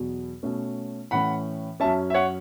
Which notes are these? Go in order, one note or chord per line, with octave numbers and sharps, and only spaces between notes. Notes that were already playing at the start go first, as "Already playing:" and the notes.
Already playing: E2 B2 F#3
B2 A3 C#4
A2 E3 C#4 F#5 B5
F#2 F#3 C#4 E5 A5
E5
C#5 F#5